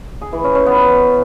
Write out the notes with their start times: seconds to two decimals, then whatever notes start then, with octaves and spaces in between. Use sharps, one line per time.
0.22 G#4
0.33 E3
0.44 C#4
0.55 C#4
0.66 B3